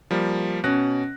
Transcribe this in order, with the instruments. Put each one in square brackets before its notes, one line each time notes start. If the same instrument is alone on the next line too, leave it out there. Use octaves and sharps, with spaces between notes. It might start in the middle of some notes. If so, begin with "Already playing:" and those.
[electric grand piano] F3 G3 A#3
[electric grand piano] B2 F#6 A#6 [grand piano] C#4